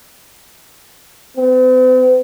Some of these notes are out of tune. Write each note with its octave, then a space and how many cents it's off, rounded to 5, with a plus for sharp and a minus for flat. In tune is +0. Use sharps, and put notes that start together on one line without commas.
C4 -45